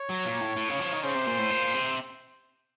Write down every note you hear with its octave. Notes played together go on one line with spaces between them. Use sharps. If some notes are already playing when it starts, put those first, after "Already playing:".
Already playing: C#5
F#3
A#2
A2
A2
C#3
F3
D#3
C#3 C5
C3
A#2
A2
A#2
C3